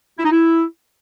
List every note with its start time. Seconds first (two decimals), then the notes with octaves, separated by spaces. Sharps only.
0.18 E4
0.24 D#4
0.31 E4